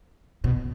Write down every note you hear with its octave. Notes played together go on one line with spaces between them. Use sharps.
B2